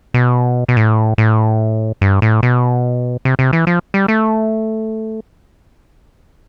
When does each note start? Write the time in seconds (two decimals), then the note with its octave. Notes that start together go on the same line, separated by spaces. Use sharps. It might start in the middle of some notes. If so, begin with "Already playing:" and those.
0.14 B2
0.68 B2
0.77 A2
1.18 A2
2.01 G2
2.22 A2
2.43 B2
3.25 C3
3.39 C3
3.53 E3
3.67 F3
3.94 G3
4.08 A3